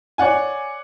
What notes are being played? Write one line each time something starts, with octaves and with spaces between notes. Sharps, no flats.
C#5 D5 F#5 G#5